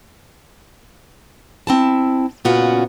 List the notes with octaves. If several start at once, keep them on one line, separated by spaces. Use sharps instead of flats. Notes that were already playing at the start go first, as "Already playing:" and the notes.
C4 E4 A5
A#2 C#3 B3 C#4 F4 F#4